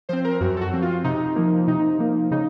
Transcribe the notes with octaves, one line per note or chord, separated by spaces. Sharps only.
F3 C4 C5
A#4
F#2 F#4
A4
F#4
F3 C4
F4
C3 D#4
F3 A#3
C3 D#4
F3 A#3
C#3 D#4